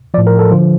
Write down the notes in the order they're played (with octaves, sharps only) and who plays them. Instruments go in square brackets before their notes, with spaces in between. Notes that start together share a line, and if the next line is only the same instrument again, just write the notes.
[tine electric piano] F3 D5
A2
A#4
A4
D3 F3 F4